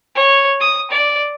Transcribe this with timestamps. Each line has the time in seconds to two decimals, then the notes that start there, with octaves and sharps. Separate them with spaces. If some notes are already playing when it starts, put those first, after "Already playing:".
0.15 C#5
0.60 D#6
0.91 D5